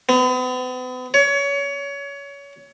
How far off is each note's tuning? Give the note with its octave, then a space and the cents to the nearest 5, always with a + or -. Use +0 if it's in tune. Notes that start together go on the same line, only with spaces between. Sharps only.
B3 +40
C#5 +25